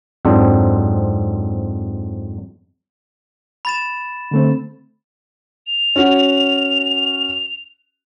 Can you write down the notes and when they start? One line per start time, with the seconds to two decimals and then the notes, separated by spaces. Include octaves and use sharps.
0.25 F2 G#2 F#3 C4 D4
3.65 B5 A6 E7
4.31 D3 A3 C4
5.67 F7
5.96 C#4 F#4